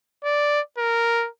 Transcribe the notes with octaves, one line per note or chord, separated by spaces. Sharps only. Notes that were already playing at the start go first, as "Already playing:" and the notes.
D5
A#4